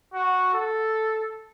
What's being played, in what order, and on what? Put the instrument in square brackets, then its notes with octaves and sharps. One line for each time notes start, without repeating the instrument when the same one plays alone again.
[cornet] F#4
A4